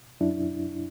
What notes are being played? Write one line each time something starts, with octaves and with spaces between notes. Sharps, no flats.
F#2 D4 E4